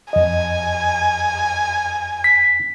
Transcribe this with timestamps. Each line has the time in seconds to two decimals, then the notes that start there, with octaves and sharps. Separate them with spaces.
0.13 F2 D#5 G#5
2.24 B6